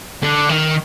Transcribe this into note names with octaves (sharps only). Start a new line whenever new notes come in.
D3
D#3